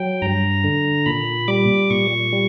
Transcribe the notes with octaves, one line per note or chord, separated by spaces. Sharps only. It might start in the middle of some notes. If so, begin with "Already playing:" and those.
Already playing: F#3 G5
G2 A#5
D3
A#2 B5
G3 D6
A#2 C#6
G3